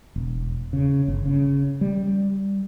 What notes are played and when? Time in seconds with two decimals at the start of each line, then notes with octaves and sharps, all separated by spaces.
0.16 E1
0.73 C#3
1.08 G1
1.26 C#3
1.81 G3